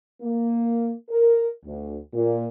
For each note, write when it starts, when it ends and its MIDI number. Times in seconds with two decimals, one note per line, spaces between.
0.22 0.92 58
1.10 1.47 70
1.65 1.96 38
2.14 2.46 46